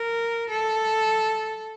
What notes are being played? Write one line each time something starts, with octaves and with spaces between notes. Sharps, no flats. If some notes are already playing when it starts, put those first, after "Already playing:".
Already playing: A#4
A4